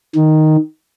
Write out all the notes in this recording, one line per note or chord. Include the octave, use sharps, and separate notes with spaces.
D#3